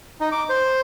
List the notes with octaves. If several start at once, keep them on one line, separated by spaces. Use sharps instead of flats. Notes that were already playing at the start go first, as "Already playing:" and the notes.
D#4
D6
C5